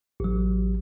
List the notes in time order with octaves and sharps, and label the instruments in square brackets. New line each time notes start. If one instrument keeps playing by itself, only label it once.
[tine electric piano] A1 F#3